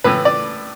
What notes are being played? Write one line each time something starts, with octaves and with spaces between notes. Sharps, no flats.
A2 E3 B4
D5